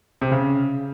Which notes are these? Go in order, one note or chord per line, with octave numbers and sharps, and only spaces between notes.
C3
C#3